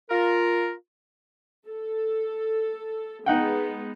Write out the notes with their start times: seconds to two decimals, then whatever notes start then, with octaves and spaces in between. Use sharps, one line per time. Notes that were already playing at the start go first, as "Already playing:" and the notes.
0.10 F4 A#4
1.68 A4
3.26 G#3 B3 D#4 F#5 G5